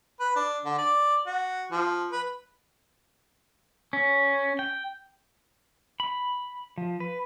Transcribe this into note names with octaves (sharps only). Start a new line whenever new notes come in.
B4
D4
D3
D5
F#4
F3
B4
C#4
G5
B5
F3
B4